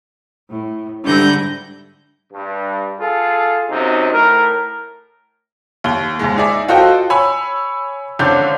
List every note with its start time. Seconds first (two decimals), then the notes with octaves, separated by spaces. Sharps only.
0.49 A2
1.04 G#2 D3 G3 E4 G6 A#6
2.33 G2
3.00 F4 G#4 A4
3.70 F#2 C3 C4 D#4
4.13 A2 A#4
5.84 D#2 G7
6.19 D#2 G#2 G#3
6.36 D#4 G#4 D5 E5
6.68 F4 F#4 A4 C5 D#5 G5
7.10 C#5 G#5 B5 E6
8.19 G#1 D3 C#4 D4 G6